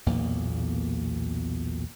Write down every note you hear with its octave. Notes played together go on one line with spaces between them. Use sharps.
B1 E2 A#2 A#3